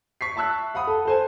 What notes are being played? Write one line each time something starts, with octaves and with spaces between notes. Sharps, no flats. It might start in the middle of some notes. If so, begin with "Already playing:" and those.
C#6 B6 C7
E5 A5 C#6 E6 F#6 B6
F5 F#5 B5 D#6
A4
A4 C5 G#5